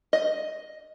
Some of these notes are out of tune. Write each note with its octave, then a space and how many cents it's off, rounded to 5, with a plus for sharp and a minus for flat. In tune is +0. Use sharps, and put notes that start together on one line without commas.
D#5 +0